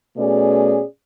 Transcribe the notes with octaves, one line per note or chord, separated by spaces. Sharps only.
B2 A3 C#4 G#4 D5